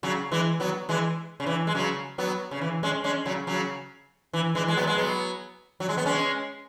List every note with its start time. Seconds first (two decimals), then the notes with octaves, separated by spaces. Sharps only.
0.03 C#3 F#3
0.32 E3 G#3
0.60 F#3 B3
0.89 E3 G#3
1.40 C#3
1.46 E3
1.67 G#3
1.75 C#3 F#3
2.18 F#3 B3
2.51 C#3
2.61 E3
2.83 G#3 C#4
3.04 G#3 C#4
3.26 C#3 F#3
3.47 C#3 F#3
4.33 E3
4.55 E3 G#3
4.68 G#3
4.77 F#3 B3
4.87 G#3
4.98 F#3 B3
5.80 F#3
5.89 G#3
5.97 B3
6.06 G#3 C#4